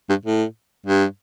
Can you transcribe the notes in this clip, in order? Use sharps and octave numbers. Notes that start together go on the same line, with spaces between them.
G2
A2
G2